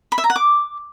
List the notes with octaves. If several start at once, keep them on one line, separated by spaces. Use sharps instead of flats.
B5
E5
A#5
F#5
D6